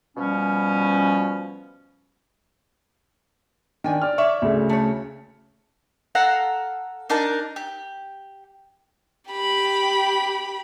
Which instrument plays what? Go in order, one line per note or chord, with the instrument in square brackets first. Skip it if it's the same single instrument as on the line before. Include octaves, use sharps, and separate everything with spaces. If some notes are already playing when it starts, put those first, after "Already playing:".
[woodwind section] B2 F3 G3 C#4
[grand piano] D#3 D4 [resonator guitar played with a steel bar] G5 G#5
[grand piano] D5 F6
[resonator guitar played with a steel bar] C#5 D5 E5 [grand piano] C#6
[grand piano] D2 C#3
[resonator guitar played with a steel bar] A3 C#5
[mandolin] A4 F5 F#5 A#5
D4 D#4 A#4 A5
G4
[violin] G4 B5